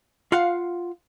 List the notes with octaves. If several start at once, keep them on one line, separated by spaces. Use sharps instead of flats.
F4 F5 F#5